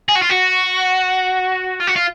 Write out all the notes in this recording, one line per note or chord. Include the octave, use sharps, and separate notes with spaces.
G#4
F#4
F4
F#4
F4
F#4
F4